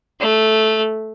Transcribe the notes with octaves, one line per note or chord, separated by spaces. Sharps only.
A3